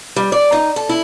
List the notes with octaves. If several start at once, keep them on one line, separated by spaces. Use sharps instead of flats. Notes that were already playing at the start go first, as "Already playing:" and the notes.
G3
D5
D#4
A4
E4